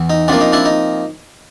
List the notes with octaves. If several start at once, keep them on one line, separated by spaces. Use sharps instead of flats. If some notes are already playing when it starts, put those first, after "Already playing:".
Already playing: E2 E3
D#4
C3 F3 A#3 D4
D#4
D4 E4
D#4